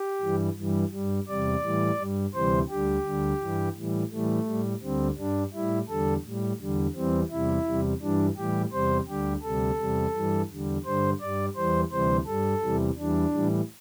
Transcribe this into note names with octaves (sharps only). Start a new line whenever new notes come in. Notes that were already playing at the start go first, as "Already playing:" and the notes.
Already playing: G4
G2 E3 G3
G2 E3 G3
G2 G3
E2 C3 G3 D5
A2 E3 G3
G2 G3
D2 C3 E3 G3 C5
D2 D3 G3 G4
D2 D3 G3
G2 E3 G3
A2 E3 G3
A2 E3 G3 A3
A2 G3
D2 D3 G3 C4
G2 G3 D4
A2 G3 E4
E2 D3 G3 A4
A2 G3
E2 D3 G3
E2 E3 G3 C4
E2 C3 G3 E4
E2 C3 G3
G2 E3 G3 D4
A2 E3 G3 G4
E2 C3 G3 C5
D2 D3 G3 G4
D2 C3 G3 A4
E2 C3 G3
G2 E3 G3
E2 D3 G3
G2 D3 G3 C5
G2 G3 D5
E2 E3 G3 C5
D2 C3 E3 G3 C5
G2 G3 A4
E2 C3 E3 G3
E2 E3 G3 D4
A2 E3 G3